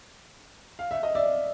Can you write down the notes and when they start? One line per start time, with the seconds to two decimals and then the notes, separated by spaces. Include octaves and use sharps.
0.79 F5
0.91 E5
1.03 D#5
1.15 D5 E5